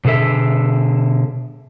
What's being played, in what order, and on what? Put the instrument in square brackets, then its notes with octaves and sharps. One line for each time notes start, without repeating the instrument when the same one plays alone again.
[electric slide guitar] B2 D3 G#4 A4 E5